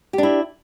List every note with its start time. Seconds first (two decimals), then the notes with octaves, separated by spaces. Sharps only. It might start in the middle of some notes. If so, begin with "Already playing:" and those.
0.13 G4
0.18 D4
0.23 E4